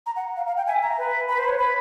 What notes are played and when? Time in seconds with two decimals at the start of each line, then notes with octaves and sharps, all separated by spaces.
0.06 A#5
0.16 F#5
0.36 F5
0.47 F5
0.57 G5
0.67 E5 G#5
0.82 A#5
0.98 B4
1.28 B4 B5
1.38 C5
1.44 B5
1.48 C#5
1.59 B4 B5